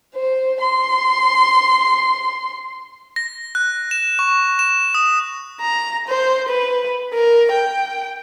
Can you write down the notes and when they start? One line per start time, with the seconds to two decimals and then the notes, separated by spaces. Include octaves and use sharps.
0.15 C5
0.61 C6
3.16 A#6
3.55 F#6
3.91 E7
4.19 C#6
4.59 E7
4.94 D#6
5.61 A#5
6.08 C5
6.49 B4
7.13 A#4
7.52 G5